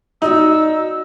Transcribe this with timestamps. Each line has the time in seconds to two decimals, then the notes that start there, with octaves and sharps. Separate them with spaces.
0.22 D#4 F#4 D5 D#5 E6